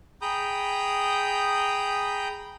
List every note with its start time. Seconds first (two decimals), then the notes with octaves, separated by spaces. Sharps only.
0.22 G#4 G5 A#5 B5 D#6 G6